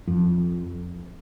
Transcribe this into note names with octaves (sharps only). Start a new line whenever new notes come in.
F2